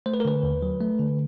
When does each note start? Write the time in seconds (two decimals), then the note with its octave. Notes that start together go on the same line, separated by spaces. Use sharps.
0.06 A3 C5
0.14 B4
0.20 A#4
0.25 D3 B4
0.43 D#2
0.62 F#3
0.80 A3
0.99 D3